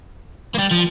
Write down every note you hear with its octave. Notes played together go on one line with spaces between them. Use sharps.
A#3
G3
F3